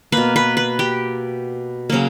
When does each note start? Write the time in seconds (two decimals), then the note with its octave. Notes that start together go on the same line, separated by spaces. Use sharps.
0.12 B2 A#3 B4
0.36 B4
0.57 B4
0.79 G4
1.90 C#3 F#3 A#3